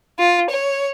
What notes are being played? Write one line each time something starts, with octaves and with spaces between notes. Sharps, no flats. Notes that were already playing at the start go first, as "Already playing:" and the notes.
F4
C#5